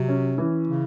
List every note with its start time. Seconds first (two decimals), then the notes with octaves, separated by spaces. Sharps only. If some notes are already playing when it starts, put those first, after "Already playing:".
Already playing: C3 F#3
0.08 C#4
0.38 E3
0.68 C#3